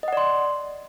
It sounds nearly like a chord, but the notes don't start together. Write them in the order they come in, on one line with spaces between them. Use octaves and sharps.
D#5 F#5 D5 C6